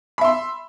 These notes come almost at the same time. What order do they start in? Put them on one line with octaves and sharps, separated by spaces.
B5 E5 C6